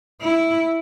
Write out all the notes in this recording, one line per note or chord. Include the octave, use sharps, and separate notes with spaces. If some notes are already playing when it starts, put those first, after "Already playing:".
E4